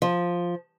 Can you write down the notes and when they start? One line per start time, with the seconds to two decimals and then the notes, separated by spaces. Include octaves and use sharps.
0.02 F3